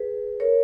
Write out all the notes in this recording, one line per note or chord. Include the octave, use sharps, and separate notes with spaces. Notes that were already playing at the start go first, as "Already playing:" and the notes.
Already playing: G#4 B4
A#4 C#5